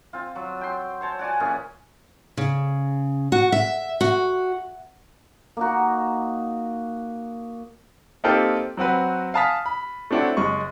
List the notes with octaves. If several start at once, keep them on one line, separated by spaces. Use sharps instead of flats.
C4 F4
F#3
G5 C6
C5 C#5 A5
F#4 D5 F#5 G#5
A#2 E3 C#4 G#4
C#3
F#4
E5
F#4
A#3 D#4 F#4
A#3 C4 D#4 F4 G4 A4
F#3 C4 F#4 B4
F5 G#5 A5 D#6 F6 B6
B5
A3 C4 D4 E4 F#4 C#5
F#1 G#3 C#6